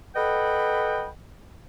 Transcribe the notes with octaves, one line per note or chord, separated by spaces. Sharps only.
A4 B4 D#5 F#5 G5 B5